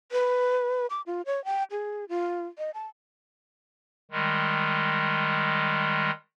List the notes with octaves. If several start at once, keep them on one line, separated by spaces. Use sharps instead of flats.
B4
D6
F4
C#5
G5
G#4
F4
D#5
A5
D#3 G3 G#3